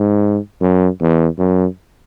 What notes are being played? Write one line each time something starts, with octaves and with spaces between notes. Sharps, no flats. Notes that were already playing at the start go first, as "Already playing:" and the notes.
Already playing: G#2
F#2
E2
F#2